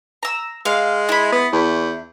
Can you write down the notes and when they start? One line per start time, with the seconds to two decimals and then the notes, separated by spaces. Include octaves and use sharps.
0.23 A#5 E6
0.65 G#3 F5
1.09 E4 B5
1.32 B3
1.52 E2